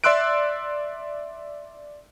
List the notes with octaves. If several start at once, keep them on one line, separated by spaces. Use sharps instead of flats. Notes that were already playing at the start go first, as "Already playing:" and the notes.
D5 E5 C6 E6 F#6 D7